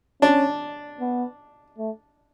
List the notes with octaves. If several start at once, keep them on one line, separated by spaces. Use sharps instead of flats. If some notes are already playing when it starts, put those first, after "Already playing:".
C#4 D4
B3
A3